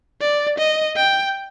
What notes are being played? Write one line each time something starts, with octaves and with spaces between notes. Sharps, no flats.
D5
D#5
G5